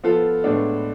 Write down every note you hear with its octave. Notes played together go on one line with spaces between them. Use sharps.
F3 B3 F4 A4
A2 G#3 B3 D4